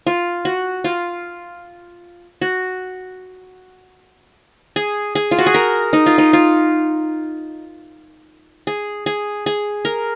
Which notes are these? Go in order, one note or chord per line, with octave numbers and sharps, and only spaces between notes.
F4
F#4
F4
F#4
G#4
G#4
F4
F#4
G#4
A#4
D#4
F4
D#4
F4
G#4
G#4
G#4
A#4